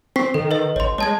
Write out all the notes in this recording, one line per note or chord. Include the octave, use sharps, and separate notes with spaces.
C4 C#6 B6 C7
D#3 A4
B4 D#5
A1 C#5 C6
G#3 C#5 A5 G#6